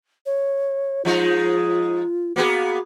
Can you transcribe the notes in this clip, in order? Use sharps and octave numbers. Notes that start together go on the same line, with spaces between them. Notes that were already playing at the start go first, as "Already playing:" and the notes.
C#5
F3 G#3 D#4 F4
A#3 B3 F#4 G#4